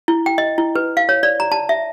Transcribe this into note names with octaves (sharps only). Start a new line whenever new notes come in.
E4
G5
D#5
E4
B4
F5
C#5
D5
A#5
A5
E5